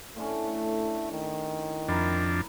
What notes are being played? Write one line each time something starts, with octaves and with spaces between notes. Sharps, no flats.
A2 D3 A3 C#4
D#3
F2 D4 E4 A#4